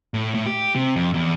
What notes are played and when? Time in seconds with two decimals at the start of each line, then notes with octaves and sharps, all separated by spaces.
0.14 A2
0.35 A2
0.46 G4
0.75 C3
0.96 F2
1.14 E2